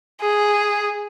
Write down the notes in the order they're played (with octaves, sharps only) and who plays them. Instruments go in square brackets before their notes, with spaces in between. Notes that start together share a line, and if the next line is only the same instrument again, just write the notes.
[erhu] G#4